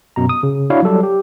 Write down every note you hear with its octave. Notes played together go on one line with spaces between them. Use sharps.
F#2 B2 A#5
D#6
C#3
D4 E4 F#4 C#5 D5 F5
F#3 G3 A4 D5
G4